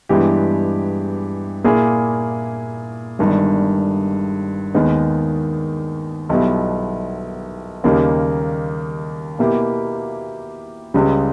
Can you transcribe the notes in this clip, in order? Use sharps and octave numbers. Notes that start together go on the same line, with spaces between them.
G2 E3 G#3 B3 G4
A#2 A#3 E4 G#4
G1 G2 D#3 G#3
D#2 D#3 G#3 B3
B1 B2 G3 B3 E4
D#2 C#3 G3 A#3 D#4
B2 A#3 E4 G4
C#2 C#3 G3